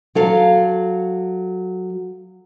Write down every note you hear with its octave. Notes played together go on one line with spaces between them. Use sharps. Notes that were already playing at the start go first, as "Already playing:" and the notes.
F#3 A4 F5